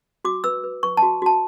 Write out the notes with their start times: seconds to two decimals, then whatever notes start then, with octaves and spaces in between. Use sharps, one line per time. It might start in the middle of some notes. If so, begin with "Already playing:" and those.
0.25 F#4 D6
0.44 B4 E6
0.64 B4
0.83 B4 C#6
0.97 A5
1.02 F#4
1.22 F#4 A5